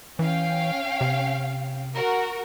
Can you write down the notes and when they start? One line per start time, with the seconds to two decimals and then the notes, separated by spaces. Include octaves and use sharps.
0.19 E3 C#4 F5 G5
1.01 C3
1.95 F#4 A#4